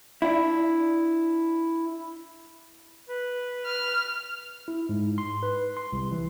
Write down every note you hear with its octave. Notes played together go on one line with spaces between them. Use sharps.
D4 E4
B4
F6
E4
G#2
C6
B4
C6
C2
E3